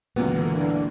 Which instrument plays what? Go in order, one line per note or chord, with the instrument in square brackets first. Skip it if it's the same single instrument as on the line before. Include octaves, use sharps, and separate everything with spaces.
[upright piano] C#2 F#2 A#2 [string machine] D3 E3 A#3 [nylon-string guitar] B3
[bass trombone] D4